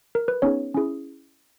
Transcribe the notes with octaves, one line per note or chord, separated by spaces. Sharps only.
A#4
B4
B3 C#4 D#4 G#4 C#5
C#4 E4 G#4